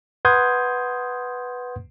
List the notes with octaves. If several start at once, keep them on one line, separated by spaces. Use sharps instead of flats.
B4 F#5 C6 D#6 G6 G#6